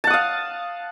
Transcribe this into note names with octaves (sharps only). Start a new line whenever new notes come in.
F5 F#5 A5 D#6